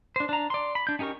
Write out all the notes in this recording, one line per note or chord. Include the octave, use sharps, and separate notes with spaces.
D4 C5
D4 A#5
D5 C6
B5
D4 G6
C#4 D#4 G4 A#4 C#6